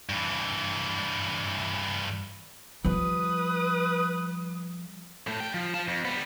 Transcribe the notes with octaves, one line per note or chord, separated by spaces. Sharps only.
G2 E3
F3 G3 B4 D#6
A2 A3
G3 G5
F3
F4 A5
F2
G3 B3